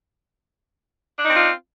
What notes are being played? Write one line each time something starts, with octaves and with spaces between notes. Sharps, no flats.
C4 D4 D#4 F4